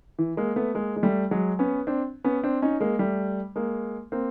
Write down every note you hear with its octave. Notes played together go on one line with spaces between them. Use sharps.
E3
G#3 A#3
A3 B3
G#3 A#3
G#3
G3 A3
F#3 G#3
B3 C#4
C4 D4
B3 C#4
C4 D4
C#4 D#4
G#3 A#3
G3 A3
G#3 A#3
A#3 C4